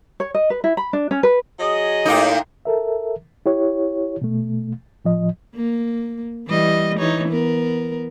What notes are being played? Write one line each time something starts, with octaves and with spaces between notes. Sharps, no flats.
C#5
D#5
B4
E4
B5
D4
C#4
B4
F#3 G#4 D#5
A2 A#3 D#4
A4 A#4 E5
E4 G4 C#5
B2 A3
A2 F3 D#5
A#3
E3 G3 D#5
E3 D#4 C#5
B3 A#4